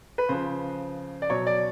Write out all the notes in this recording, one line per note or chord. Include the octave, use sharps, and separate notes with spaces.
B4
C#3 F3 C5
D5
B2 F#3 C#5
D5